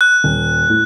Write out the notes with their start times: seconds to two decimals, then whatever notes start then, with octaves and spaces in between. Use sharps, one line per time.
0.01 F#6
0.24 D#1
0.70 A2